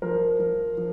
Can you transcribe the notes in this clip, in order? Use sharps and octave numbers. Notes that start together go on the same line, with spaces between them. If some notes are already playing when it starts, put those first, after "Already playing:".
F3 A#4 C5
F3
F3